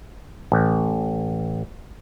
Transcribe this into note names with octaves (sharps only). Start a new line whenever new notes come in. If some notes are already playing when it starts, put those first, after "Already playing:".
A1